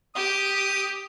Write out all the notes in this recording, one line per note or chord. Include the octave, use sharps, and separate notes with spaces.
G4 D#6